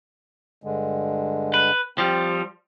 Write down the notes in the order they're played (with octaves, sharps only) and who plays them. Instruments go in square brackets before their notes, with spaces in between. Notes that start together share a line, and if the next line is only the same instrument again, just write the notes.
[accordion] G2 D3 G#3
[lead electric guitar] B4
[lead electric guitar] F3 G3 [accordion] C4